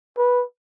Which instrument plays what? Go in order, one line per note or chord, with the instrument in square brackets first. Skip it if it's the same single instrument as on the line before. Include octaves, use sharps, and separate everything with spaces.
[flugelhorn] B4